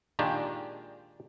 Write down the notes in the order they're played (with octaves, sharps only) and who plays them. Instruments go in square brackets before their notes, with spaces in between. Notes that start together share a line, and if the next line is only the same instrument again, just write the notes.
[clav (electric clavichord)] A#2 D#3 G#3 D4 G4